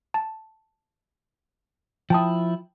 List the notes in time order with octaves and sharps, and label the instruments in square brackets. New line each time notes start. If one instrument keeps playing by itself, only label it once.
[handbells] A5
[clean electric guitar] F3 E4 [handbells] G5 A5 D#6